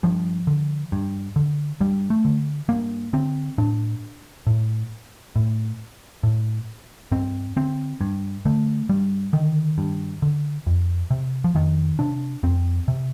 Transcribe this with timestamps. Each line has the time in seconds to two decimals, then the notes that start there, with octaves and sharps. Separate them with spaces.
0.03 G2 F3
0.47 D3
0.92 G2
1.36 D3
1.81 G2 G3
2.10 A3
2.25 D3
2.69 G2 A#3
3.13 D3 C4
3.58 A2 D4
4.47 A2
5.36 A2
6.23 A2
7.12 G2 C4
7.57 D3 C4
8.01 G2
8.45 D3 A3
8.89 G2 G3
9.33 D3 D#3
9.78 G2
10.22 D3
10.67 F2
11.10 C3
11.44 F3
11.55 F2 D#3
11.99 C3 D4
12.43 F2 C4
12.88 C3